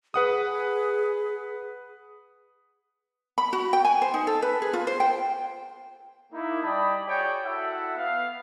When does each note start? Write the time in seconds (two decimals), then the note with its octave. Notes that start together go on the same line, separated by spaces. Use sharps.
0.14 G#4 B4 F#5 D#6
3.38 B5
3.53 F#4
3.73 G5
3.85 G#5
4.02 C5
4.14 D#4
4.27 A4
4.42 B4
4.62 G#4
4.73 F4
4.87 C5
5.00 G5
6.31 A#3 D#4 E4
6.63 G3 D5 D#5 G5 A5 B5
7.05 F#4 G#4 C#5 D5 G5
7.43 E4 F#4 A4 E5 F#5
7.96 B3 F5